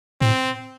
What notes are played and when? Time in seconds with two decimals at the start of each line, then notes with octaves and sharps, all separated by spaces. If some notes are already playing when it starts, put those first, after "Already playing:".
0.21 A2 C4